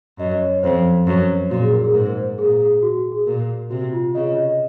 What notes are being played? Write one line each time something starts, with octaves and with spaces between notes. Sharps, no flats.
F#2 D#5
C#5
F2 C5
F#2
A#2 F#4
G#4
A#4
G#4
G#2 A#4
C5
A#2 G#4
G#4
F#4
F#4
G#4
A#2 A#4
C3 F#4
F4
C#3 D#5
D#5